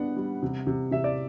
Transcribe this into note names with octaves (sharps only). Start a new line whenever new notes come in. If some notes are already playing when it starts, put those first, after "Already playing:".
Already playing: G3 B3 D4 F#5
G3
C3
C3
C3 E5
D5